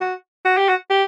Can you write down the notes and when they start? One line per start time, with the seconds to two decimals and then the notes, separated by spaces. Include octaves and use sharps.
0.01 F#4
0.45 F#4
0.57 G4
0.68 F#4
0.90 G4